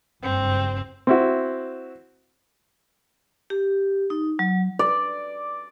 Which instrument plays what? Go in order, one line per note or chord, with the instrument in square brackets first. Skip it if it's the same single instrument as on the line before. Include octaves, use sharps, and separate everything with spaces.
[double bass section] F#1 G2 [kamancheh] C4
[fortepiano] C4 E4 F#4
[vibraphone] G4
D#4
F#3
[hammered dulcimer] D5